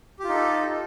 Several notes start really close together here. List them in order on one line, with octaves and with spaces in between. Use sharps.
G4 F4 D#4 A4